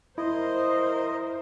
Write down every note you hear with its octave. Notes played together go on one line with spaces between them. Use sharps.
E4 A#4 C5 D#5